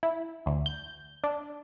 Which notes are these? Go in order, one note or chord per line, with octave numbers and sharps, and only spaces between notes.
E4
D2
G6
D4